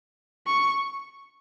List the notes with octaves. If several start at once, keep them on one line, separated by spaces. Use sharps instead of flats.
C#6